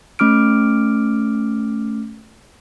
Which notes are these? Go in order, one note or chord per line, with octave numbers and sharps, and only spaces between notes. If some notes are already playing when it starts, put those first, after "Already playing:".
A3 C#4 D6 F6 D7